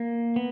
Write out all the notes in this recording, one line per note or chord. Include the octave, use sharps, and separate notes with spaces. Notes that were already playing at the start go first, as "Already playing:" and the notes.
Already playing: A#3
B3